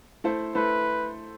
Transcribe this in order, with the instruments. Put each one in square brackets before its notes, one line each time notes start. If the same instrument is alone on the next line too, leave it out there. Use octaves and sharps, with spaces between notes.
[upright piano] A3 E4 A4 C5
[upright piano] A3 E4 A4 C5 [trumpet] B4